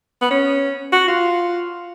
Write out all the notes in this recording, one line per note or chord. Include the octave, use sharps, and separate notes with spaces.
B3
C#4
F#4
F4